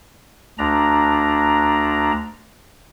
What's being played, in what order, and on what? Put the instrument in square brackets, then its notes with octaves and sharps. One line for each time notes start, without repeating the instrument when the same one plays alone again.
[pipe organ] D2 D4 A#5